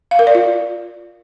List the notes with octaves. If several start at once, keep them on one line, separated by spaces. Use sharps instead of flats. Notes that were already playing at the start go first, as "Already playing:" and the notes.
F5
A#4
D5
F4